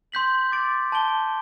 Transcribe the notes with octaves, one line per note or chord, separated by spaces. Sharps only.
C6 G6 B6 F#7
D6 A6 D7
A5 C6 G6 D7 G7